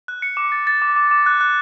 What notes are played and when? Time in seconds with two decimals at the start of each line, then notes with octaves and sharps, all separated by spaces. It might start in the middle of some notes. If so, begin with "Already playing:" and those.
0.08 F#6
0.22 C#7
0.37 D6
0.52 A6
0.67 A6
0.82 D6
0.96 D6
1.11 D6
1.26 F#6
1.41 F#6